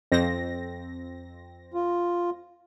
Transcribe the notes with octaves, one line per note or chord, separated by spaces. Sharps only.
F2 C4 A#6
F4